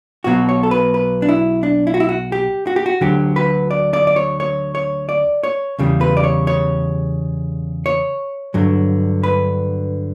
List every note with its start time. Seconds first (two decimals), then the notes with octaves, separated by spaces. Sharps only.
0.24 B1 B2 F#3 F#4
0.49 C#5
0.63 A4
0.71 B4
0.94 B4
1.22 D4
1.29 E4
1.63 D4
1.87 E4
1.94 F#4
2.00 E4
2.09 F#4
2.32 G4
2.67 F#4
2.76 G4
2.86 F#4
3.01 D2 D3 F#3 G4
3.36 B4
3.71 D5
3.93 D5
4.07 D5
4.16 C#5
4.40 C#5
4.75 C#5
5.09 D5
5.43 C#5
5.79 E2 C#3 G3
6.01 B4
6.17 D5
6.24 C#5
6.47 C#5
7.86 C#5
8.54 G2 D3 F#3
9.23 B4